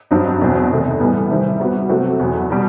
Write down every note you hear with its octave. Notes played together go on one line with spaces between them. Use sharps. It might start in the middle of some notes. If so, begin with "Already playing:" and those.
G2 F#3 C4 D#4
E2 B2 F#3 C4
E2 C3 D#3 A3 D#4
A2 E3 G3 B3
C3 D#3 G3 C4 E4
G3 B3 F#4
C3 F#3 A3 C4 F#4
E2 B2 F#3
B2 G3